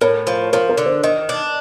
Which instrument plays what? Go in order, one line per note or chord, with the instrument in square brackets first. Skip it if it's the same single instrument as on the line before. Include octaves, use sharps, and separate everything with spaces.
[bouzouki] A2 [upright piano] A#4
[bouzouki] F3
[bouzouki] F3 [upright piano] A#4
[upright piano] A#4
[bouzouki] D3
[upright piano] C5
[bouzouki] D#3 [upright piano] D#5
[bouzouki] D4